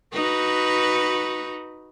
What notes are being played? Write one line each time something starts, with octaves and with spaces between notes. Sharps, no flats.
D#4 F#4 B4